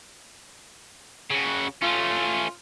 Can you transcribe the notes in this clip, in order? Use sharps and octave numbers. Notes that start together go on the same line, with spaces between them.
C#3 F#4
A3 C#4 F4